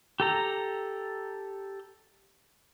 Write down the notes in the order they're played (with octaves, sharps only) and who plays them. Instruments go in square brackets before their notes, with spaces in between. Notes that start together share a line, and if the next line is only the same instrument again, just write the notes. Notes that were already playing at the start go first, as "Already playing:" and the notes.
[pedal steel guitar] G4 A4 A#5